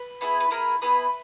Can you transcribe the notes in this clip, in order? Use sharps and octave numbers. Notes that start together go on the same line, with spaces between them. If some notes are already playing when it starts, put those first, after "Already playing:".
Already playing: B4
B3 E4 G#4
B4
B3 E4 G#4 A#4
B3 E4 G#4 B4